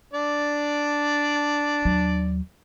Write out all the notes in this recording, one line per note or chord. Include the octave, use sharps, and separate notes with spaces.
D4 D5
D#2 F#3